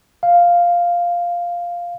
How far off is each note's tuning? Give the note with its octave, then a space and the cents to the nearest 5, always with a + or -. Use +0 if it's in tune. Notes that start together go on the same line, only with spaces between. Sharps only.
F5 +0